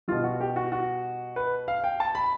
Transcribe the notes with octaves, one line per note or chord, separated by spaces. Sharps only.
B2 G3 F4
F#4
G4
F#4
F#4
B4
F5
G5
A5
B5